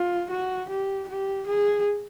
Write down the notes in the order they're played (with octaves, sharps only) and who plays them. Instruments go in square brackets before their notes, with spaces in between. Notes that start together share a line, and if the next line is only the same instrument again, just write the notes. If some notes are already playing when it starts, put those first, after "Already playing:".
Already playing: [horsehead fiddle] F4
F#4
G4
G4
G#4